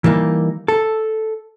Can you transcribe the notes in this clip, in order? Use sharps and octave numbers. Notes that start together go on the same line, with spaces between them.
E3 G3 A#3 D#4
A4